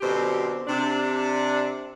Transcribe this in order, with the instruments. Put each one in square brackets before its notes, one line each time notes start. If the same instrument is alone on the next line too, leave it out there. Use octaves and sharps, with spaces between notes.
[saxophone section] F#2 B2 D3 C4 G4 C5
C3 D4